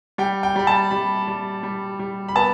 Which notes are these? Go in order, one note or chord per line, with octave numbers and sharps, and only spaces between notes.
G3 G5
G5
G3 B5
A5
G3 B5
G3
G3
G3
B5
B3 A5